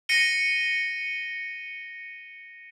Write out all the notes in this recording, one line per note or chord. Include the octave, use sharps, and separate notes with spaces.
A#6 C#7 D#7 G7